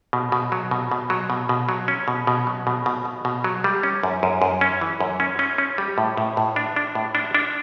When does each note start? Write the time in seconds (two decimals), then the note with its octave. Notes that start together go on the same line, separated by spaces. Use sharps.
0.13 B2
0.32 B2
0.52 F#3
0.71 B2
0.91 B2
1.10 F#3
1.30 B2
1.49 B2
1.69 F#3
1.88 C#4
2.08 B2
2.27 B2
2.47 F#3
2.67 B2
2.86 B2
3.05 B2
3.25 B2
3.44 F#3
3.64 G3
3.83 C#4
4.03 F#2
4.23 F#2
4.42 F#2
4.61 C#4
4.81 E3
5.00 F#2
5.20 C#4
5.39 C#4
5.58 C#4
5.78 G3
5.98 A2
6.17 A2
6.37 A2
6.56 D4
6.76 D4
6.95 A2
7.15 D4
7.35 D4